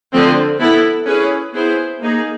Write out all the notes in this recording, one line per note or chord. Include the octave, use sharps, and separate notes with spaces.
D3 F3 A3 C4
B3 E4 A4
C#4 E4 G#4 B4
B3 E4 G#4 C5
A#3 D#4 G#4